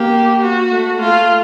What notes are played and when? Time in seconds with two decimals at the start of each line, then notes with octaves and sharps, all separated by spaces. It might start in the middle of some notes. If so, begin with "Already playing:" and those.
Already playing: A#3 G4
0.42 F#4
0.71 A3
1.01 A3 F4